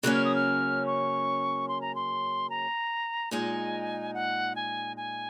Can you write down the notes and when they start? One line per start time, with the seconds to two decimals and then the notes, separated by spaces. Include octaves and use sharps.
0.03 C#3 F#3 A#3 C#4 F#6
0.14 F6
0.24 D#6
0.35 F6
0.86 C#6
1.68 C6
1.81 A#5
1.95 C6
2.50 A#5
3.31 A#2 G#3 D#4 G#5
4.14 F#5
4.56 G#5
4.97 G#5